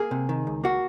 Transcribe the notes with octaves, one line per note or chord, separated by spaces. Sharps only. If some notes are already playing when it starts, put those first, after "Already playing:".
Already playing: A#3 G#4
C3
D#3
C#2
A#3 F#4